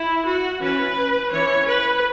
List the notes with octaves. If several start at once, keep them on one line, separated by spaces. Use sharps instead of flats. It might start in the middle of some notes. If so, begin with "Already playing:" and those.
Already playing: E4
F#4
E3 C#4 B4
E3 C#4 C#5
B4